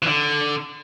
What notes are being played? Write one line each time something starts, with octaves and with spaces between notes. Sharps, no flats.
E3
D3